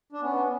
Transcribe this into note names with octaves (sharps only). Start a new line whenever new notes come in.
D4
B3 C#4